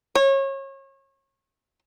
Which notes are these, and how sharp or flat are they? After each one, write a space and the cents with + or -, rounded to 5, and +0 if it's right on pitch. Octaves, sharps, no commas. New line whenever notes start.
C#5 -30